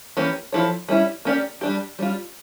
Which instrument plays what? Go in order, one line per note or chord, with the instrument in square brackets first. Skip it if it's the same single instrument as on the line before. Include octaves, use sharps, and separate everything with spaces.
[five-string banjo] E3 A#3 C#4 G4
F3 A3 E4 A4 C#5
G3 C#4 E4
A#3 C#4 G4 D5
G3 D4 G4
G3 C#4 F4